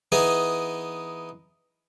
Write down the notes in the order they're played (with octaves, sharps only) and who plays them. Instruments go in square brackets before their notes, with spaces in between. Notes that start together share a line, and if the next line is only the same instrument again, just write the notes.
[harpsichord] E3 B3 D#4 G#4 D#5